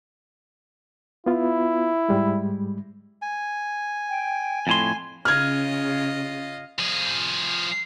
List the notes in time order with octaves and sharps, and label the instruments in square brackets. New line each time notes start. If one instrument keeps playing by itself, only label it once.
[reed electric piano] B3 F4 [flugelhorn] E4
[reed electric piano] G#2 G3 G#3
[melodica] G#5
[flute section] G5
[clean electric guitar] F2 A2 C6 [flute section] G#6
[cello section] C#3 [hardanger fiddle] F4 D#5 [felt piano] F6 G#6
[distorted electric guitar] F3 G#4